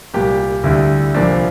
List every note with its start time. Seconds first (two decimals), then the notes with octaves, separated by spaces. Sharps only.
0.14 C2 A#2 G3 G4
0.64 D2 D3 G3 E4
1.14 C2 A#2 F3 D4